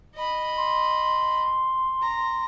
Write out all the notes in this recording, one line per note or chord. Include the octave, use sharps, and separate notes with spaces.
D#5 B5
C6
A#5